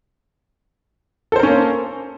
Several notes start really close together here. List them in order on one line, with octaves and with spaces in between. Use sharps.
A4 C5 A#4 C#4 A#3